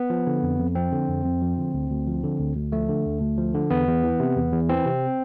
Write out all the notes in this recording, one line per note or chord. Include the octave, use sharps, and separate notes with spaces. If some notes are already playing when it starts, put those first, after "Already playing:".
Already playing: B3
F3
D3
F2
F2
F3 C4
D3
F2
F2
F3
D3
D2
D2
F3
D3
D2
D2
F3 A3
D3
D2
D2
F3
D3
E2 B3
E2
E3
C3
E2
E2
E3 C4
C3